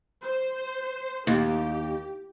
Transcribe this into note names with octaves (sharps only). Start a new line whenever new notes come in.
C5
D#2 G4